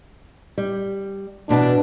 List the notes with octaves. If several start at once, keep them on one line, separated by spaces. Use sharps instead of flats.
G3
E2 B2 D4 A5